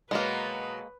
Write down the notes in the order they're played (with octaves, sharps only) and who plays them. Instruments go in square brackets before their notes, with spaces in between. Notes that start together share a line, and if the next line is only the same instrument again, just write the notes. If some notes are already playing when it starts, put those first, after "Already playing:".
[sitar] B2 F#3 [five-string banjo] G#3 A#3 [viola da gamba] B4